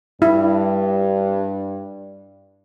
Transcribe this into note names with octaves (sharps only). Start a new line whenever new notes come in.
G2 G3 E4